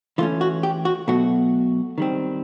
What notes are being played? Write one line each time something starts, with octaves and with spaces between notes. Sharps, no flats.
E3 A3 C#4 F4
F#4
G4
F#4
B2 F#3 A3 F#4
D#3 G3 C4